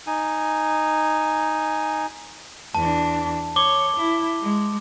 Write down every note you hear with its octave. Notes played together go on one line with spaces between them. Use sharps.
D#4 G#5
E2 D4 A5
C#5 D6 G7
E4
G#3